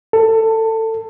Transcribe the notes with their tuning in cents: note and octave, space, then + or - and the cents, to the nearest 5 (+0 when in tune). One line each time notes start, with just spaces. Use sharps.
A4 +20